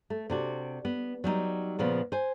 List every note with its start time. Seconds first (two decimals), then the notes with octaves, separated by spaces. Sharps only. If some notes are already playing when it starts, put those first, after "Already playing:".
0.10 A3
0.30 C3 D4 F#4
0.85 B3
1.24 F#3 G3 C#4 D#4
1.79 A#2 C#3 F3 B3
2.12 C5 G#5